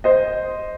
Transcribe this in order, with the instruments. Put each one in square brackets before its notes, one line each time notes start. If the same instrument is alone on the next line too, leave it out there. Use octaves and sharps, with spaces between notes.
[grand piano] C5 D#5